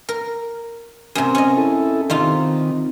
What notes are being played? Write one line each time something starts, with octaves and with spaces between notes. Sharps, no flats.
A#4
F#2 C3
C#4 D#5
E4 A4
C3 D#3 D#4 F4